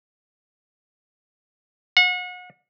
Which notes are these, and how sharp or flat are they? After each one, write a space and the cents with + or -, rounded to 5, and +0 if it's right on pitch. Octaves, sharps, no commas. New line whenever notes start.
F#5 -35